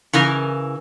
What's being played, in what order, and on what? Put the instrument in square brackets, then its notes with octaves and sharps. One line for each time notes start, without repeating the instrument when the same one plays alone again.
[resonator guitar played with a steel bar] C#3 E3 A#4